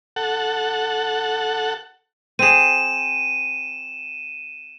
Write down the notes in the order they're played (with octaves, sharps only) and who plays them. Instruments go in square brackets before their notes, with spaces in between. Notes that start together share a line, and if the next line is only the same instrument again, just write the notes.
[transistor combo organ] A4 F#5
[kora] C4 G#4 [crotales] D#7 E7